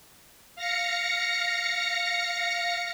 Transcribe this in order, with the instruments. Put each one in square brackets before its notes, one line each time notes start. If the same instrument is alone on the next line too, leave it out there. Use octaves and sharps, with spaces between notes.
[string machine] F5 A#6 C#7